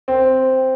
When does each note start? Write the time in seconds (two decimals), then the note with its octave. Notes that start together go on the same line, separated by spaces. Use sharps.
0.08 C4